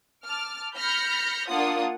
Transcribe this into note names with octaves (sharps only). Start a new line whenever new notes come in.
A5 D6 F6
B5 F6 G6 A#6 C#7
A#3 D4 F4 F#5 D#6